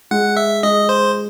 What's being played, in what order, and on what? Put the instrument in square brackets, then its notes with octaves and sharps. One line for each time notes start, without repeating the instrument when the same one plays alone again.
[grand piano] G#3 [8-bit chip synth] F#5
[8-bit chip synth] E5
[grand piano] G#3 [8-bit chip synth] D#5
[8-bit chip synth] C5